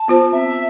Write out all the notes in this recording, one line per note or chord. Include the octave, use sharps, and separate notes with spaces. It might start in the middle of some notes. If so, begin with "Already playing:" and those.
Already playing: A5
B3 F4 C5
C4 E5